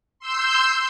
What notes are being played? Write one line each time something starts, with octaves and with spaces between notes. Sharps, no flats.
C6 E6 G6